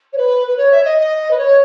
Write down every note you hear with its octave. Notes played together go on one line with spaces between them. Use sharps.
C#5
B4
B4
C#5
E5
D#5
D#5
B4
C#5